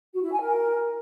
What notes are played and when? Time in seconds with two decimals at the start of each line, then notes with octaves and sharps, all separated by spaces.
0.14 F#4
0.23 E4
0.31 G#5
0.40 A#4